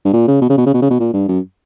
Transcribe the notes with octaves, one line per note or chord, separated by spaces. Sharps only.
G2
A#2
C#3
B2
C#3
B2
C#3
B2
C#3
B2
A#2
G2
F#2